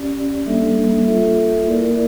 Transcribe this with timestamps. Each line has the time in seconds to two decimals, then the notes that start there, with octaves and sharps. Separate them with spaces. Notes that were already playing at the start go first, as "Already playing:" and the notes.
Already playing: C#4 G4 D5
0.46 G3 A#3 D4 A4 E5
1.06 F4 A4 E5
1.65 A#3 E4 A#4 D5